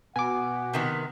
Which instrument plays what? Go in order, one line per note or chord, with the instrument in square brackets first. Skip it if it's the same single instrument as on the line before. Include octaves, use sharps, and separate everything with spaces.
[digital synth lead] B2 [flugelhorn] F#5 [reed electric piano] G#5 D6
[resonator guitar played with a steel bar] C3 D#3 B3